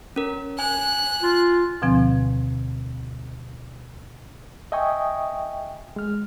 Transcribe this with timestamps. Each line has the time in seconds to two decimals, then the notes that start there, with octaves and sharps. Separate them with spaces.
0.16 C#4 A#4
0.59 G#5 F#6
1.22 F4
1.82 D2 B2 D3 F3 C4 G#5
4.72 D#5 E5 G5 G#5 C#6 D#6
5.96 G#3 F6